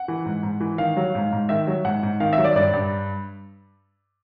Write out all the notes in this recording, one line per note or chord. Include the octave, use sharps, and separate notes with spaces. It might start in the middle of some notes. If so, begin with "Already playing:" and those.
Already playing: F#5
E3
G#2
G#2
E3
D#3 F5
F#3
G#2
G#2
D#3 E5
F#3
G#2 F#5
G#2
D#3 F5
F#3 E5
D5
G2 D5
G2